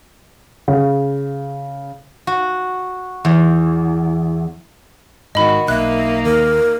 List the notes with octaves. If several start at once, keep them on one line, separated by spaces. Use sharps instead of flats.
C#3
F#4
E2
G#2 D#3 F#4 D#5 B5
B1 A#3 D#4 E5 F#6
D#2 A#4